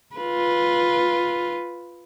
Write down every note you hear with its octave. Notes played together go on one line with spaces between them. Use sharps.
F4 B4